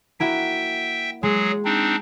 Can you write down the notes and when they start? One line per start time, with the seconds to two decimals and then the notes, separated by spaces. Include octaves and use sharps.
0.20 A#3 E4 F#4 E5 G5
1.23 F#3 G#3 G#4
1.65 C4 D4 D#4